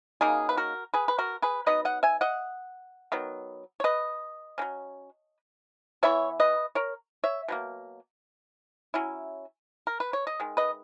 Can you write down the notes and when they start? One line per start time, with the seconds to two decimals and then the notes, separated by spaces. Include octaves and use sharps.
0.21 C#3 F#3 A#3 D#4 G#4
0.49 B4
0.57 F#4 A#4
0.94 G#4 B4
1.08 B4
1.19 F#4 A#4
1.42 G#4 B4
1.66 F#3 B3 D#4 B4 D#5
1.85 D#5 F#5
2.03 E5 G#5
2.21 D#5 F#5
3.12 D#3 F#3 B3
3.80 C#5
3.84 B4 D#5
4.58 F#3 A#3 C#4
6.03 E3 B3 E4 C#5 E5
6.40 B4 D#5
6.75 A#4 C#5
7.24 C#5 E5
7.48 B2 F#3 A#3
8.94 F#3 C#4 E4
9.87 A#4
10.00 B4
10.13 C#5
10.27 D#5
10.40 D#3 G#3
10.57 B4 D#5